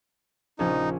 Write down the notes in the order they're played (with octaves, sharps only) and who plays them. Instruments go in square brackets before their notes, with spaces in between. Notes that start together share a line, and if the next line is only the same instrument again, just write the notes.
[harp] A#1 C#4 [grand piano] C#3 F3 [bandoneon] D#4